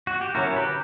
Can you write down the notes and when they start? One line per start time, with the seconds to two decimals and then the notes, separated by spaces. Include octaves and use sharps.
0.07 F#4
0.21 G4
0.35 D3 F#3 C#4 E4 F#4 A#4
0.56 G4 B4